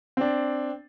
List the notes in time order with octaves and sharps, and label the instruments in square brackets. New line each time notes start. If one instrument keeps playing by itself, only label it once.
[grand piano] C4 D4